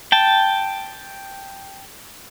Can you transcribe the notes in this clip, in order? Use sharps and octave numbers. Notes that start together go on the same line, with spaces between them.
G5 A5